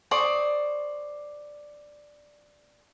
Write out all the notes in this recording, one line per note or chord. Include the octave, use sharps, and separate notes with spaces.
C5 D5 C#6 D#6